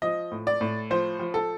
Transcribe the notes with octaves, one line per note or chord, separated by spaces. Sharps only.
F3 D#5
A2
D5
A2
F3 C5
F3
A4